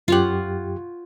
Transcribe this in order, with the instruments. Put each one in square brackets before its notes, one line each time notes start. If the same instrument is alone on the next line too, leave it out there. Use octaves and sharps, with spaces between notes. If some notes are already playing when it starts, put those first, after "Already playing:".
[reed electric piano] F#2 G4 [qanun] F4 C#5 F#5